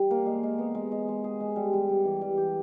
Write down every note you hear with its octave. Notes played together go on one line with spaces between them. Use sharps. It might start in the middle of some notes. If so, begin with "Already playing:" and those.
Already playing: G3
A#3
G#3
G#3
B3
G#3
G#3
G#3
G#4
G#3
G3
G3
G3
E3
G3
G4